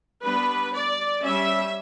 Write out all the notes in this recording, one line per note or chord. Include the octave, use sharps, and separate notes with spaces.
G3 B3 D4 B4
D5
G3 C#4 E5